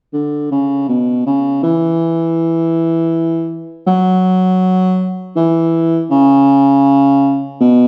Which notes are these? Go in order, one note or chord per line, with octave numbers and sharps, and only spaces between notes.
D3
C#3
B2
C#3
E3
F#3
E3
C#3
B2